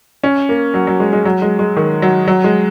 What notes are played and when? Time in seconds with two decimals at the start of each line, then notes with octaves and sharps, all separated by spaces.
0.24 C#4
0.49 A#3
0.74 F#3
0.87 F#3
1.00 G#3
1.13 G#3
1.25 F#3
1.42 G#3
1.59 G#3
1.77 D#3
2.02 F#3
2.28 F#3
2.44 G#3